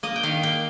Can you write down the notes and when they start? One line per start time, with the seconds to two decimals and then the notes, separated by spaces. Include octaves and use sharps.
0.03 A#3 D#5
0.16 G5
0.23 D#3 F5
0.43 A#3 G5